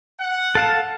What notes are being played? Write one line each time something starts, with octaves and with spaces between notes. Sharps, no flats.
F#5
A4 F5 A5